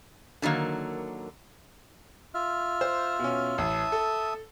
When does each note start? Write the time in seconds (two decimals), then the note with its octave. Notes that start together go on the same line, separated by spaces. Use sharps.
0.42 D3 D#3 F#3 A#3
2.34 F4 E5 F6
2.81 C5
3.19 B2 C#4
3.58 A1 E5 A5 D#6
3.92 A4